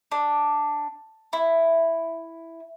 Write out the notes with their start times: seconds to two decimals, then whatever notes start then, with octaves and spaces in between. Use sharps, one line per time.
0.12 D4
1.33 E4